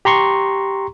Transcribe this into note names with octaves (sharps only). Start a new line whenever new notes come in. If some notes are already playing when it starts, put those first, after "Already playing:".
G4 A#5 C6 C#6